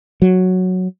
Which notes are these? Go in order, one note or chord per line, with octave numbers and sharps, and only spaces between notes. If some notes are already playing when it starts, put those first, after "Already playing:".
F#3